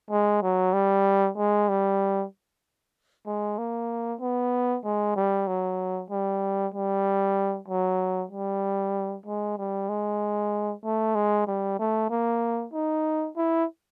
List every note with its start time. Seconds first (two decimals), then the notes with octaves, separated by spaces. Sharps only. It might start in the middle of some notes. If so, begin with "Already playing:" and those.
0.10 G#3
0.42 F#3
0.73 G3
1.37 G#3
1.69 G3
3.27 G#3
3.58 A#3
4.21 B3
4.84 G#3
5.16 G3
5.47 F#3
6.10 G3
6.74 G3
7.68 F#3
8.31 G3
9.26 G#3
9.58 G3
9.89 G#3
10.84 A3
11.15 G#3
11.47 G3
11.79 A3
12.10 A#3
12.73 D#4
13.37 E4